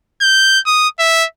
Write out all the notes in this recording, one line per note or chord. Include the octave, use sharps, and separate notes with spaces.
G6
D#6
E5